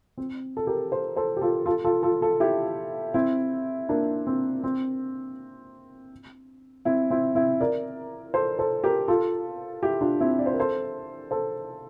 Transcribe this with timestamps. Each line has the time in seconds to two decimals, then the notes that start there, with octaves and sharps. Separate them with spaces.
0.17 C4
0.57 A4
0.67 G4 A#4
0.92 A4 C5
1.16 A4 C5
1.37 G4
1.41 F4 A4
1.66 F4 A4
1.85 F4 A4
2.03 F4 A4
2.21 F4 A4
2.40 E4 G4
3.14 C4 E4
3.89 A#3 D4
4.27 C4
4.64 C4
6.85 C4 E4
7.10 C4 E4
7.35 C4 E4
7.60 A#4 D5
8.34 A4 C5
8.59 A4 C5
8.84 G4 A#4
9.08 F4 A4
9.83 E4 G4
10.01 D4 F4
10.20 C4 E4
10.39 D5
10.46 C5
10.53 A#4
10.60 A4 C5
11.31 A4 C5